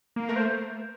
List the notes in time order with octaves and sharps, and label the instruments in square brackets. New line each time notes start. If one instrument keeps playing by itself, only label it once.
[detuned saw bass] A#3
[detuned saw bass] A3 [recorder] A#4
[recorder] C5